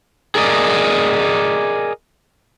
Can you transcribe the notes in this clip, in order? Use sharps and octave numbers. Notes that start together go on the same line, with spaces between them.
G#4 A#4 D5 D#5